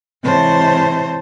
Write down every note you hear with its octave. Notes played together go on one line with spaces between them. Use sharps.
G#2 C3 E3 C5 C#5 A5